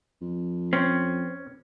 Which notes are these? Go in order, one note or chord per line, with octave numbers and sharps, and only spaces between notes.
F2
C4 C#4